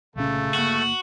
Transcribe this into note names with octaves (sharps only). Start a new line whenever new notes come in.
C2 A#2 C#3 A3 C#4
G1 A#3 F#4